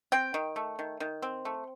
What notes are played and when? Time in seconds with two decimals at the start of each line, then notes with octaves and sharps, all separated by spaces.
0.12 C4 G5
0.34 D#3
0.56 A3
0.79 D#3
1.00 D#3
1.22 C4
1.45 A3